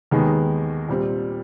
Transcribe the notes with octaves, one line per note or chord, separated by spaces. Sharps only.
D#2 D#3 G#3 B3
A#2 G3 C4